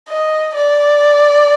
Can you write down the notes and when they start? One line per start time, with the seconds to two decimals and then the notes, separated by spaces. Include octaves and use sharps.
0.09 D#5
0.55 D5